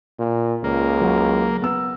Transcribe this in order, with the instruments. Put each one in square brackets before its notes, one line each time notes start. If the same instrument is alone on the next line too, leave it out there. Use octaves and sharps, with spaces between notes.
[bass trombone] A#2
[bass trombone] C#2 [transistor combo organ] A#3
[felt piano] F#3
B3 E6